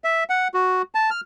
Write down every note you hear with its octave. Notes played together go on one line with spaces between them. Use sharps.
E5
F#5
F#4
A5
F6